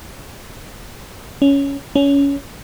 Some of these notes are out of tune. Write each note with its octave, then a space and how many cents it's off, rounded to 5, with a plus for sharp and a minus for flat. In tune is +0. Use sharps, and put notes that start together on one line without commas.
C#4 +10
C#4 +20